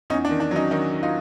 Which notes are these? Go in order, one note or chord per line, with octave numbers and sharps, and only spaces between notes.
E2 C#4 D#4
D4
D#3
D4
F#3 C#4 D#4
D#3 C#4 D#4
D#3
D#4 F4